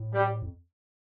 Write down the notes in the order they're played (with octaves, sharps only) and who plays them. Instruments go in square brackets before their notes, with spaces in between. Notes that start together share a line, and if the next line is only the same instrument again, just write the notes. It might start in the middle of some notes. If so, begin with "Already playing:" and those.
Already playing: [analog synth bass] A2
[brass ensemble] G3
[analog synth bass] F2